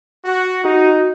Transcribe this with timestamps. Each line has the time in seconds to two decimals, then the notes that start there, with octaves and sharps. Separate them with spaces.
0.25 F#4
0.64 D#4 F#4